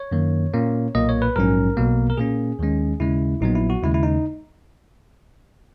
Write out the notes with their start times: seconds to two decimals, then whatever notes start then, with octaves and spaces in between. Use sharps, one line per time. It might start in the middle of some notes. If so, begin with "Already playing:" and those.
Already playing: C#5
0.11 F#2 D#3 A#3
0.54 A#2 A#3 C#4
0.95 B1 A#2 A#3 D#5
1.09 C#5
1.22 B4
1.36 A#1 G#2 F#3 C#4 A#4
1.77 B1 B2 A#3
2.10 A#4
2.17 A#2 A#3 C#4 G#4
2.59 D#2 D#3 G#3 C#4
3.00 D#2 C#3 G#3 C#4 E4
3.41 A#1 A#2 F#3 B3 D#4
3.55 E4
3.70 F#4
3.83 D#2 C#3 G#3 E4
3.94 E4
4.03 D#4